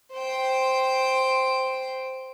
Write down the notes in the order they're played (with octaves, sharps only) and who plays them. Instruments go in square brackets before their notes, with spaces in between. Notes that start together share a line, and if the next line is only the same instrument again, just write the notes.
[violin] C5 G5